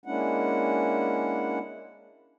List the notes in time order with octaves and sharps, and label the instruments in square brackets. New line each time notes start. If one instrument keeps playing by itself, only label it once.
[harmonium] G#3 A#3 C#4 D4 E4 F#5